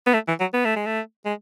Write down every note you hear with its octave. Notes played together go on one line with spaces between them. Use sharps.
B3
A3
E3
F#3
B3
A3
G#3
A3
G#3